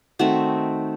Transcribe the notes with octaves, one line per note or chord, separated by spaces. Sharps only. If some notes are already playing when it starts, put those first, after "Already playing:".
D#3 A3 C4 F#4